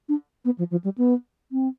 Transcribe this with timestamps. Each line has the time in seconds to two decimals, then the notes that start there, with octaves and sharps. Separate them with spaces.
0.09 D4
0.45 B3
0.58 F3
0.71 F3
0.84 G3
0.98 B3
1.52 C4